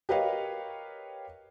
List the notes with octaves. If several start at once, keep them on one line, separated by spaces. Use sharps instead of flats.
G4 A#4 B4 C#5 D#5 F5